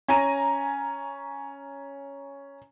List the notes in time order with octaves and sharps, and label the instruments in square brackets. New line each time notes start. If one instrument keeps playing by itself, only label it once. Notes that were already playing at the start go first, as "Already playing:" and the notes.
[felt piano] C#4 G#5 A#5 D#7